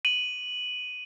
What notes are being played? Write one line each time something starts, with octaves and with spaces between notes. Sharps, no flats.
D#7 F#7